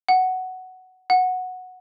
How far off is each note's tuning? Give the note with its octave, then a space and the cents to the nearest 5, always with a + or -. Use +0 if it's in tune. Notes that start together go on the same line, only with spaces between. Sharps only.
F#5 +10
F#5 -5